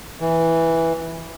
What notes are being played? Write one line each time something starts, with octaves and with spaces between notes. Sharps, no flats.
E3